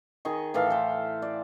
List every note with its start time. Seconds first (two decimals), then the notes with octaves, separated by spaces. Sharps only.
0.25 D#3 G#4 D#5 C#6
0.54 A2 E3 A4 F5
0.70 C5 G5
1.22 D5